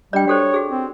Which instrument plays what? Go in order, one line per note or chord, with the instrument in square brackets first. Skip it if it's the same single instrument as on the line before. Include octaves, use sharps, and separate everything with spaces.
[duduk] G3 [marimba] D4 G4 D#5 [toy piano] D5 G5
[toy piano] F#4 A4 C5 [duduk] C#5
[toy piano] F#4 G#4
[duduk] C4